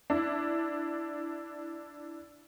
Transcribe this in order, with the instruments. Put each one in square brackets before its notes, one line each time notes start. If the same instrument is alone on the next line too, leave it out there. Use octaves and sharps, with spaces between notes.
[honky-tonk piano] D4 E4